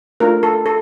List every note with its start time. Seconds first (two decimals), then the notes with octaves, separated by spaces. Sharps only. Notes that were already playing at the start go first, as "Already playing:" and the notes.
0.20 A3 D4 F4 A#4
0.43 A4
0.66 A4